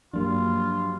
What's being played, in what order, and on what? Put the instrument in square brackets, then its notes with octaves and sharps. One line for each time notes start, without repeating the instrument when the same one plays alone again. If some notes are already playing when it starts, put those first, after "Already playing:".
[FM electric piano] G2 A#3 D4 [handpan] F3 F#3 G4 [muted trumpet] F4